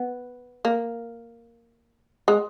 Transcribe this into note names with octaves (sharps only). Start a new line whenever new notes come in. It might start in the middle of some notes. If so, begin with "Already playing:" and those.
Already playing: B3
A#3
G#3